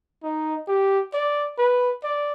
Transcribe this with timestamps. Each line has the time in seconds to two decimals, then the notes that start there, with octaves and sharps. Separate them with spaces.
0.23 D#4
0.68 G4
1.14 D5
1.58 B4
2.04 D5